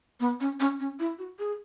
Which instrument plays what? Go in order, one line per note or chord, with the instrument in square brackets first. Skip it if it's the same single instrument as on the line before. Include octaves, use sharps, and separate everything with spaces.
[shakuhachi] B3
C#4
C#4
C#4
E4
F#4
G#4